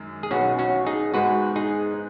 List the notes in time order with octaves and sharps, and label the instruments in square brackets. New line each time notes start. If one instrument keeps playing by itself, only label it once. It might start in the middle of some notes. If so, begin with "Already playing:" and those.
Already playing: [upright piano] F#2 D#3 G#3
[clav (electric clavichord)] G#4
[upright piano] B1 B2 B3 D#4 B4 [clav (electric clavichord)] C#4 F#4
[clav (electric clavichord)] C#4 F#4
D#4 G#4
[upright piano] G#2 G#3 B3 G#4 [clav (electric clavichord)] F#4 B4
[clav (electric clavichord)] D#4 G#4